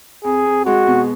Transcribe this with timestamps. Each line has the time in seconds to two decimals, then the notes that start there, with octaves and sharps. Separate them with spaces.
0.24 F2 G#4
0.46 F2
0.65 G#3 F#4
0.87 B2